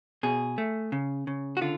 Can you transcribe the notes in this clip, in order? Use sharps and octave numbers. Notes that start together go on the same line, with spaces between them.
B2 G#4
A3
C#3
C#3
F#4
D3 F4